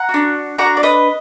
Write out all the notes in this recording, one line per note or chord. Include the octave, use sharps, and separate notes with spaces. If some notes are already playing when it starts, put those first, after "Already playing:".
Already playing: F#5 A#5
F#4
D4
D4 F#4 F#5 A#5
D5
B4 D#5